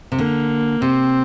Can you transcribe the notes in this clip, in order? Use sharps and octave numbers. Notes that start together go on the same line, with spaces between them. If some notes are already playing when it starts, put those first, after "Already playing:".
C3
D3 A#3
C3 C4